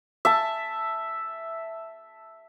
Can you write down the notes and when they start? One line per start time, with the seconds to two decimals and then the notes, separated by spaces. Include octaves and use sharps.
0.25 E5 A5